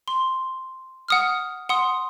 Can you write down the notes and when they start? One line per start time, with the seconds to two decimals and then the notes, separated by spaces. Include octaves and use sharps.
0.08 C6
1.08 F#5 D#6 F6
1.69 F#5 C6 D#6